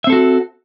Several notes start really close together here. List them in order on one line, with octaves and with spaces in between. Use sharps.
E5 C4 A4 F#4